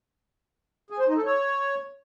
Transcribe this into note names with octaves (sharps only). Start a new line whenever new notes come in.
G#4
C5
D#4
A4
C#5